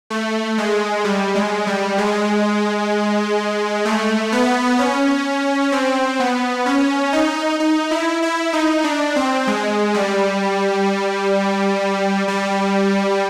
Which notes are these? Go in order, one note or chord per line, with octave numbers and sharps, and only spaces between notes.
A3
G#3
G3
G#3
G3
G#3
A3
B3
C#4
C4
B3
C#4
D#4
D#4
E4
E4
D#4
D4
C4
G#3
G3
G3